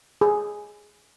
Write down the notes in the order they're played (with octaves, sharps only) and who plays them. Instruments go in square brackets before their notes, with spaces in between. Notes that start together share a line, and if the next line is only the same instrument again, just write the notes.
[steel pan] G#4